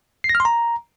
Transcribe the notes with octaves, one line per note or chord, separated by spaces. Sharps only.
C7
A#6
F6
C6
A#5